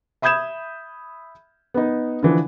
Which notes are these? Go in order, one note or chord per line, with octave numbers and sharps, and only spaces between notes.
E5 B5 D#6 G6 G#6 E7
B3 D#4
D3 E3 F3